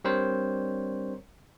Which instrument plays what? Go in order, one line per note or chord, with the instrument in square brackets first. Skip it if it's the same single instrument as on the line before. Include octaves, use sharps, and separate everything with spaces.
[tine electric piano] G3 C4 D4 A#4 C5 C#5